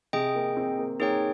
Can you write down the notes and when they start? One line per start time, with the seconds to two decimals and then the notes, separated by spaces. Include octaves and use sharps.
0.13 C3 G#4 D#5 G5
0.35 A#3
0.57 C4
0.79 A#3
1.00 A#3 D#4 G#4 C#5 G5